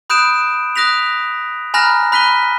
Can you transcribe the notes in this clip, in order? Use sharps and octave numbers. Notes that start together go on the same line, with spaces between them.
B5 D#6 F#6 G6 D7 E7
D#6 F#6 A#6 B6 F7
G#5 A#5 B5 F6 F#6 A#6
B5 F#6 B6 D#7 G7